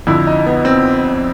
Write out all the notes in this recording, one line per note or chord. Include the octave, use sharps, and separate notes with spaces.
F2 D3 E4
D#4
B3
C4